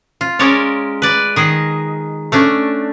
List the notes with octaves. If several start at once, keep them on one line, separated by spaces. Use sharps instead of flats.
F4
G#3 C#4 A#4 C#5 D5
B4 D5
D#3 G#4 D#5
A3 C#4 D4